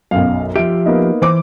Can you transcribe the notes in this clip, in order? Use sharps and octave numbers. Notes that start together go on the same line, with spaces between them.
B1 F#2 F5
F3 F4 G4 E5 D7
A#3 B3 D#4
E3 C5 D6